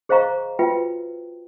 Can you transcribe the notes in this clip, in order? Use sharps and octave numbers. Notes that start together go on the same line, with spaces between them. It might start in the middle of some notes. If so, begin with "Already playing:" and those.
G#4 C5 D#5 F5 A#5 C#6
F4 F#4 B4 E5 G5